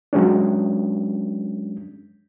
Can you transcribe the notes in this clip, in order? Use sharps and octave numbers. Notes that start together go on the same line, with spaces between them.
F#3 G#3 C#4 D4